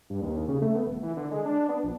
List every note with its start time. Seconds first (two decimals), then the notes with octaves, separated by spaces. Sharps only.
0.10 G2
0.22 D#2
0.48 C#3
0.62 A3
0.75 B3
0.87 D#1
1.03 E3
1.17 D3
1.31 G#3
1.45 D4
1.69 B3
1.83 A#1